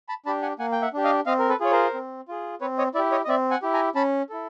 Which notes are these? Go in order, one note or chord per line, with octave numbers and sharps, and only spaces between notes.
A5 B5
D4 G4 A5 B5
F#5 G#5
A#3 F#5 G#5
G5
E5 F#5
D4 G4
D#5 F5
C4 D#5 F5
A#4
A4 B4
F4 G#4 C#5
A#4 C5
C4
F4 G#4
C4 B4 C#5
C#5 D#5
E4 G4 D5 E5
C#5 D#5
D#5
C4 D5 E5
F#5 G#5
E4 G4
G#5 A#5
C#4 A5 B5
E4 A4